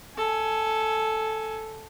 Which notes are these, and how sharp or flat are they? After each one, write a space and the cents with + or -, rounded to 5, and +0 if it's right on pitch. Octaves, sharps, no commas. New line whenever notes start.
A4 +0 G#5 +15